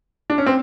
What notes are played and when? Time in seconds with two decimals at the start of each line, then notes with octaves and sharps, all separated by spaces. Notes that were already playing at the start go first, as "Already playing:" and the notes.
0.30 D4
0.38 C#4
0.46 C4